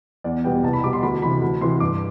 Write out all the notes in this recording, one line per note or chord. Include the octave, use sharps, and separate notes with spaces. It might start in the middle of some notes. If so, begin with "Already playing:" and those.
E2 D5
B2 G3 B3 G5
C2 A5
B5
B2 G3 B3 D6
C6
D2 B5
C3 E3 B5
D2
C3 E3 C6
G2 D6